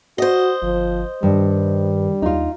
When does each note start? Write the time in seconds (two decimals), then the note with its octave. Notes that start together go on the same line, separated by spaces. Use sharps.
0.18 F#4 C5 D#5
0.62 G1 F3
1.23 G2 D#3 G3
2.22 D#2 D#4 F4